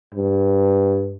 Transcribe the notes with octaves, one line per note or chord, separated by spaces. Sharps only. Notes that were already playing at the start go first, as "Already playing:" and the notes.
G2